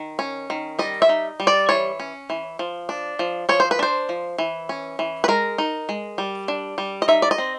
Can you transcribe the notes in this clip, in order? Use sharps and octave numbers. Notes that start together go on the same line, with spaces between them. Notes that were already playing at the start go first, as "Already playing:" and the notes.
Already playing: D#3
C#4
D#3
G3 D#5
E5
D#4
G3
D5
E3 C#5
C#4
E3
F3
D4
F3
F3 C#5
C5
B4
D4 C5
F3
E3
C#4
E3
B4
G#3 A#4
D#4
G#3
G3
D4
G3
D#5
D#4 E5
D5
D#5
C4